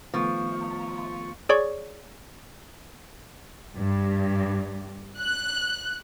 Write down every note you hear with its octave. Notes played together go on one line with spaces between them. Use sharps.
D#3 F3 A3 B3 C#6
G#4 C#5 D5 C#6
G2
F#6